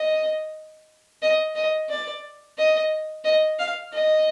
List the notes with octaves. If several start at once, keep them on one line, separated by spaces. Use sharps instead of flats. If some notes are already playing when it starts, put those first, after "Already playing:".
Already playing: D#5
D#5
D#5
D5
D#5
D#5
F5
D#5